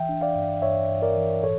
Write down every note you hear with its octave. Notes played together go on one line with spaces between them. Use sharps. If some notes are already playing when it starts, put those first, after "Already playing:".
Already playing: E3 E5 G5
D4
D5 F5
G2
G2 C#5 E5
G2
A#4 D5
E3
A2 A4 C#5